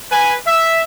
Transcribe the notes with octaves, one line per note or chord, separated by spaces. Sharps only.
B4 G#5
E5